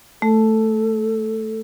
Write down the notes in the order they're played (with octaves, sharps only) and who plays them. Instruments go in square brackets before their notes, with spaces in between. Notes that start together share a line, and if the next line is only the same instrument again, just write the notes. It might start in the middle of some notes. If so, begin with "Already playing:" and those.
[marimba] A3 [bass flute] A4